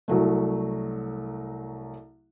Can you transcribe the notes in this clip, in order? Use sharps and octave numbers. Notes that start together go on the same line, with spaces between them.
C2 F#3 A3